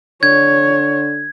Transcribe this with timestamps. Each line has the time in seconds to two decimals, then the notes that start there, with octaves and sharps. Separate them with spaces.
0.23 D3 C#5 G#6